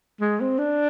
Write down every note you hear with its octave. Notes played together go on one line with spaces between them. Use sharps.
G#3
C4
D4